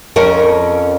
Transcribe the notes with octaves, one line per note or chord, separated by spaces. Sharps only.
F2 C#4 A#4